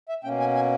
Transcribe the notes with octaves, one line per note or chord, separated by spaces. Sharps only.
E5
B2 A#3 C#4 G5
G#5
G#5